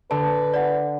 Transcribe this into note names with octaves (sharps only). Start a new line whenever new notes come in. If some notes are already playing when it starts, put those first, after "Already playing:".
D3 B4 A5
D5 F#5